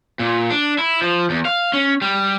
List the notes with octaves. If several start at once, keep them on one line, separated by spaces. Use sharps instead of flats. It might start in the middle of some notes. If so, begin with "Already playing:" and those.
A#2
D4
E4
F3
E2
F5
C#4
G3